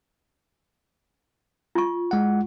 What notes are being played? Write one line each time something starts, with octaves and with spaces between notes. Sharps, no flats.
F4 C#6
G#3 F#5